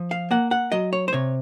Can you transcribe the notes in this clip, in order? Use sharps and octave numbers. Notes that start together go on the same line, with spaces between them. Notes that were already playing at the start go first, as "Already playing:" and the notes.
Already playing: F3
F5
A#3 F#5
F#5
F#3 D#5
C#5
C5
C3 C#5